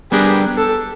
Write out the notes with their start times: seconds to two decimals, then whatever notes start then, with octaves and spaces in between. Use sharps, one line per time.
0.12 G3 B3 D4 G4 G#4 A#4
0.58 A4